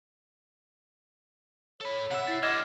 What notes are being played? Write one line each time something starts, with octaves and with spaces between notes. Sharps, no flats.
A4 C#5 B5
C3 E5 F#5
E4 A6 C7
D3 G3 D#5 D6 F6 G#6 E7